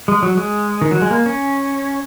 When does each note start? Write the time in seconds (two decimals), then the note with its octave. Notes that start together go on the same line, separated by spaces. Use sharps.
0.08 G#3
0.23 F#3
0.37 G#3
0.81 D#3
0.91 F#3
1.02 G#3
1.11 A#3
1.26 C#4